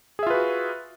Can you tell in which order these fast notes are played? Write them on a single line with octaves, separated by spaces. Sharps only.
G#4 E5 F4 B4 F#4